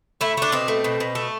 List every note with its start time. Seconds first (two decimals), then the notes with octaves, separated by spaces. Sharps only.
0.21 A3 E4
0.37 A3 D4
0.52 B2 C4
0.68 A3
0.84 B2
1.00 B2
1.15 A3